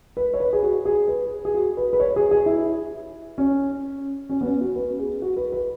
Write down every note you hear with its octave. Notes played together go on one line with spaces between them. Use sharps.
B4
C#5
B4
G#4
F#4
G#4
B4
G#4
F#4
B4
B4
C#5
G#4
G#4
E4
C#4
C#4
B3
C#4
F#4
B4
G#4
F#4
B4
B4